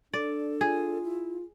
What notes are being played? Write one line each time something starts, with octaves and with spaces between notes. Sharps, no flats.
D4 A4 D5
F4 G#4
E4